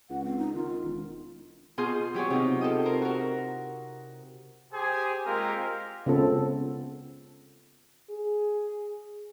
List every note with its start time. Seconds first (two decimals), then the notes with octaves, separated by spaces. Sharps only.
0.10 C#2 F#5
0.24 C4
0.38 D#4
0.54 D#3 F4
0.84 E1
1.78 B2 F4 G#4 C6 G6
2.14 F#3 G4 G#4 C#5
2.30 C3 D#4 F4
2.61 F4 A4 G5 D#6
2.85 A#4 C5
3.02 F#4 A#4
4.73 G4 G#4 C5 G#5
5.26 G#3 A#3 C4 F4 G4 A#4
6.06 C#3 B3 C4 F4 A4
8.10 G#4